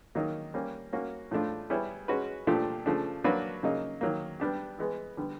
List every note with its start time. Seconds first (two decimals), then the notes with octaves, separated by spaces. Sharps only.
0.15 D#3 F#3 A#3 D#4
0.54 G3 A#3 C#4
0.93 A#3 C#4 F#4
1.31 A2 F3 A3 D4 F4
1.70 G3 B3 E4 G#4 C#5
2.08 G#3 C#4 F#4 B4
2.47 A#2 F3 A3 D4 G4
2.86 C#3 F3 A3 D4
3.24 F#3 A#3 D4 F#4 B4
3.63 C#3 F#3 A#3 D#4
4.01 D#3 F#3 A#3
4.40 G3 B3 D4 G4
4.79 E3 G#3 B3
5.17 D3 G3 B3